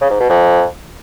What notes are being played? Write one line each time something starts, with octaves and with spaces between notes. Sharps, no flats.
C#3
G#2
B2
F2